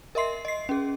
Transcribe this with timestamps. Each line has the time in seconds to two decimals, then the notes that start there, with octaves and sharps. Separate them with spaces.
0.15 A#4 D#5 E5 C6 C7
0.45 D#5 C7
0.69 C#4 G#4